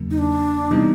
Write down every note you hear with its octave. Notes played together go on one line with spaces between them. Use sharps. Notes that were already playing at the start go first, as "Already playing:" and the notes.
Already playing: E2 C#3 F#3 A#3
D#4
D4
C3 E3 G3 B3 D#4